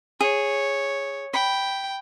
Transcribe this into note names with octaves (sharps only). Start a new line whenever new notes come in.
G#4 C#5
G5 B5